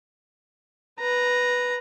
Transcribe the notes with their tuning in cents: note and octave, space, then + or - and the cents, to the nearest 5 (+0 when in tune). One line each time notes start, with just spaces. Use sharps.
B4 -5 A#5 +0